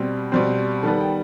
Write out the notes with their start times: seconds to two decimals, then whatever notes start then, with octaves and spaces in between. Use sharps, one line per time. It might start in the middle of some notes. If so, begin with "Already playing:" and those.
Already playing: B2 G3 C4
0.32 B2 G3 C4 C5
0.83 D#3 G3 B3 A4
1.00 G5